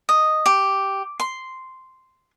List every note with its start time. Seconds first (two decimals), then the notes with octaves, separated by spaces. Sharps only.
0.09 D#5
0.46 G4
1.20 C6